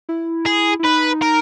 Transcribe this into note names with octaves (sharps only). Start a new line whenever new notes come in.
E4
G#4
E4
D#4 B4
A#4